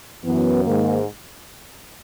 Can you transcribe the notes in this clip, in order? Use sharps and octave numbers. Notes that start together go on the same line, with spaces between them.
F#2 E3 B3
G#2 D#3 A#3